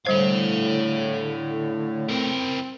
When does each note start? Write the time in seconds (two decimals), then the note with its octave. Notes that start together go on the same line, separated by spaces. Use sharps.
0.07 A2 D3 G3 C5 C#5 F5
2.09 C4 E4 A#4